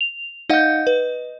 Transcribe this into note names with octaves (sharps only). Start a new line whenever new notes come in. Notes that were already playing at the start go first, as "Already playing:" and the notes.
F7
D#4 D#5 F5 F#5 G6
B4